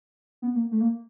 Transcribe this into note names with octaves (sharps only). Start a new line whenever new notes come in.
B3
A#3
A3
A#3